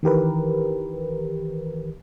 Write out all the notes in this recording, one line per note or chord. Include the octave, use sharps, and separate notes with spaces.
D#3 E3 G4 A#4 B4